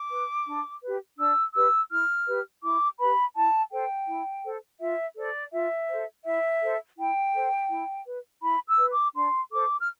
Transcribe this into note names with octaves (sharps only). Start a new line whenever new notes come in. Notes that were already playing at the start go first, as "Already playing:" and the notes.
Already playing: D6
B4
D4
G4 B4
D4 E6
G4 B4 E6
E4 F6
G4 B4
E4 D6
G4 B4 B5
E4 A5
A4 C5 G5
E4
A4 C5
F4 E5
A4 C5 D5
F4 E5
A4 C5
E4 E5
A4 C5
E4 G5
A4 C5
E4
B4
E4 B5
E6
B4
D6
D4 C6
A4 C5 D6
F6